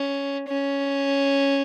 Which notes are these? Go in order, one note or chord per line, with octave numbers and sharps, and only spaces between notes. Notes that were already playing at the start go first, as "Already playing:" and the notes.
Already playing: C#4
C#4